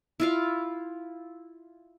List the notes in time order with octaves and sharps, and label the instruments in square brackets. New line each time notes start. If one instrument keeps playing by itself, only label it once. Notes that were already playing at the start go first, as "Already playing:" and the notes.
[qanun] E4 F4 F5